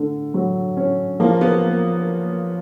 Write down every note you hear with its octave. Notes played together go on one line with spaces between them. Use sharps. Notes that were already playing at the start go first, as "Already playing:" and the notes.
Already playing: D3 A3
F#3
C#4
F3 A#3
B3